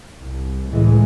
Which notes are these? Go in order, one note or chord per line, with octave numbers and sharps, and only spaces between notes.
C2
C#2 A2 E3 G#3